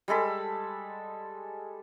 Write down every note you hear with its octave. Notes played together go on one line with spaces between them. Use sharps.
G3 G#3 A4 B5